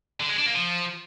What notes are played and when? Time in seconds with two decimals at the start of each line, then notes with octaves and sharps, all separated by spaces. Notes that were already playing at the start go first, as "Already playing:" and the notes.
0.20 D3
0.29 G#3
0.38 D4
0.46 A#3
0.55 F3